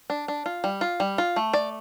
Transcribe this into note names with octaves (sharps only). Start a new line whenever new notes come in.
D4
D4
F4
G3
F4
G3
F4
A3
D5